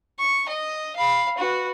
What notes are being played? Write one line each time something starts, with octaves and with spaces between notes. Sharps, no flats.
C#6
D#5
F5 B5
F#4 B4